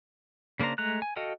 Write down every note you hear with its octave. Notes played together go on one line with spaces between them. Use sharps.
C#3 A#3 D4 C5 A#5
G#3 A3 A#5 F#6
G#5
F#4 A4 D#5 F5 G5